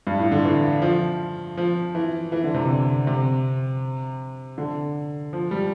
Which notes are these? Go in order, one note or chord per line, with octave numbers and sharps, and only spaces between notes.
G2
A2
D3
E3
F3
F3
E3
E3
D3
C3
D3
C3
D3
F3
G3